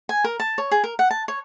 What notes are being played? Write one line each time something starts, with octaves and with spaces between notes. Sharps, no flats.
G#5
A#4
A5
C#5
G#4
A#4
F#5
A5
C#5